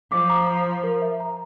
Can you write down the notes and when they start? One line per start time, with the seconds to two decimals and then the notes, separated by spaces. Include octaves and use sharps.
0.11 F3 D6
0.30 A#5
0.47 A#5
0.65 A#5
0.84 A#4
1.02 E5
1.20 A#5